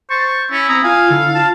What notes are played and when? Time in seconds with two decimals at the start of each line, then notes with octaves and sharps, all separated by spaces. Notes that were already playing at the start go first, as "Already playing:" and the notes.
0.10 C5 C#6 A6
0.51 C#4 E4
0.69 C4 A#5 D#6
0.84 F4 F5 G#5
1.10 D3 E4 A4
1.35 F4 A5